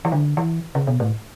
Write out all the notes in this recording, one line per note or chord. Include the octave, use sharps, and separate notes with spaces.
E3
D3
E3
C#3
B2
A2